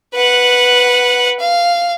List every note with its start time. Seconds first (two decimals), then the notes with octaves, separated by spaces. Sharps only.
0.14 B4 F#5
1.40 F5